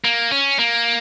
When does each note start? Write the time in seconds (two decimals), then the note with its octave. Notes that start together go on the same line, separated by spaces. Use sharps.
0.04 A#3
0.31 C#4
0.59 A#3